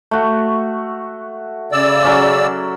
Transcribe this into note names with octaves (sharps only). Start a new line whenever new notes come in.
A3 F#4
C#3 D5 E6
F#3 C#4 D6